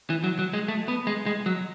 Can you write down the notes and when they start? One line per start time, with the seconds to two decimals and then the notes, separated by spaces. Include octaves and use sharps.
0.10 E3
0.24 F#3
0.39 F#3
0.53 G#3
0.68 A3
0.88 B3
1.07 G#3
1.26 G#3
1.46 F#3